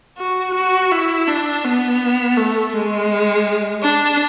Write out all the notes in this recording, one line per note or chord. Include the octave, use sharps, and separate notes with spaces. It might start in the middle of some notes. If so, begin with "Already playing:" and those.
F#4
F#4
E4
D4
B3
A3
G#3
D4